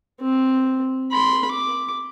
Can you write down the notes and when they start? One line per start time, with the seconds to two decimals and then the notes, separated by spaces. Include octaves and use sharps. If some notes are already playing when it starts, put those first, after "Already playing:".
0.21 C4
1.12 B5 C6
1.51 D6